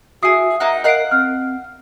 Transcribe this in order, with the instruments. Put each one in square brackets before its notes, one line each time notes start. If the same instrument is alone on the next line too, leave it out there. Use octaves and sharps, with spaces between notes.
[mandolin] E4 G#4 [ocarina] F#4 [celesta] D#6 C7
[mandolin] A#3 D#4 F#5 [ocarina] E5
[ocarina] A#4 [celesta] D#5 C7 D7 [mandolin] F5 F#5 F#6
[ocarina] C4 [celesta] F6